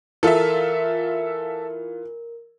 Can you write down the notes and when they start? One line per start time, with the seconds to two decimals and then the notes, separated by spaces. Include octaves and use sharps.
0.23 E3 F4 A4 A#4 E5